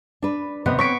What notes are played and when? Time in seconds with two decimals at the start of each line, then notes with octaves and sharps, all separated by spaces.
0.22 D4 B4
0.66 D#2 C3 B3 D#5
0.79 C4 C#5 C#6 B6 D7